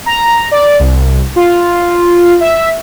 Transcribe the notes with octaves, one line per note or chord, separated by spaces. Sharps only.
A#5
D5
C2
F4
E5